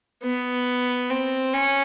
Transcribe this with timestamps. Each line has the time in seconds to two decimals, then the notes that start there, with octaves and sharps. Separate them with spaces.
0.23 B3
1.10 C4
1.54 C#4